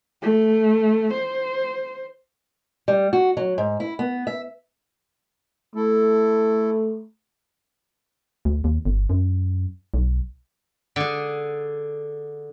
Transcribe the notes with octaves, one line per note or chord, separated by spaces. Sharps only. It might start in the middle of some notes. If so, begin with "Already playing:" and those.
A3
C5
G3
F#4
F#3
G#2
E4
B3
E5
A3 E4 A4
D2
D#2
G1
F#2
B1
D3 G#4